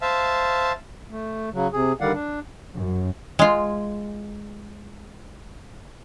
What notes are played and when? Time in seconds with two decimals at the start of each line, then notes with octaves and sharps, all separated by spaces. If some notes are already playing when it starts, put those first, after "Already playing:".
0.01 C5 E5 F5 A5
1.11 A3
1.53 C#3 F#3
1.73 C3 G#4
2.01 D3 D#3 G3 D5 F5 F#5
2.13 D4
2.74 F#2
3.39 G#3 F4